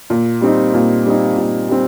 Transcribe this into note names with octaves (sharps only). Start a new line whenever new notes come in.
A#2
G3 C4 D#4
A#2
G3 C4 D#4
A#2
G3 C4